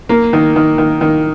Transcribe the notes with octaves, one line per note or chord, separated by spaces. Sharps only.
A#3
D#3
D#3
D#3
D#3